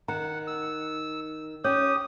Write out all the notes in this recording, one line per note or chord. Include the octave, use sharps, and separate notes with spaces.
D#3 F#5 A#5
E6
C#4 G4 C#5 D#6